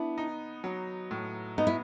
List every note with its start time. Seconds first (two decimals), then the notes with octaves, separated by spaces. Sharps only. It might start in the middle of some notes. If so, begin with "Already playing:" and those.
Already playing: B3 D4 E4
0.18 D#4
0.64 F#3
1.11 A2
1.58 B3 D#4
1.67 E4